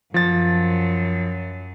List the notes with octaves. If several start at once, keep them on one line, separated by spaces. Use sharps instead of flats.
F#2 F3 A6